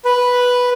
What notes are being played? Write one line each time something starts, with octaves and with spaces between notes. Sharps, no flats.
B4